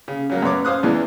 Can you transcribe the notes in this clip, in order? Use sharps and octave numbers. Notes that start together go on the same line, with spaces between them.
C#3
C#3 F#3 A#3
F#2 B3 C#5 D6
C#4 C5 F5 D#6 F#6
E2 E3 G#3 D4